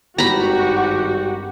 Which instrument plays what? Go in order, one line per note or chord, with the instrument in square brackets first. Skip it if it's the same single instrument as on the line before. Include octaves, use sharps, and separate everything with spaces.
[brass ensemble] G#1 G2 [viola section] F#4 [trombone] G4 [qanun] A#5 B5